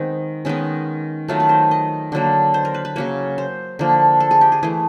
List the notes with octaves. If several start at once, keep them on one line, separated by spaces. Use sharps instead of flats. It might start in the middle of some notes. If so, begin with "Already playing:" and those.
Already playing: D#3 G#3 B3 C4
D#3 G#3 B3 C#4
D#3 F#3 A3 F4
B4
C5
D#5
D3 F#3 A#3
C5
A#4
B4
B4
C#3 F#3 A#3 C#5
C5
D3 F3 A#3
A4
G#4
G4
G#4
E3 A3 G#4